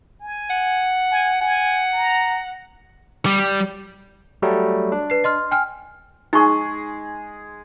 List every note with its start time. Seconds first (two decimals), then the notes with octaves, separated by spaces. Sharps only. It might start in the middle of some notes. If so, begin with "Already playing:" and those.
0.21 G#5
0.50 F#5
1.11 G#5
1.41 F#5 G#5
1.93 A#5
3.26 G3
4.42 F#3 G3 A3
4.92 D4
5.10 B4 C7
5.24 D#5 C6 F6
5.51 G5 G#5 F6
6.33 G#3 D#4 G#4 C#6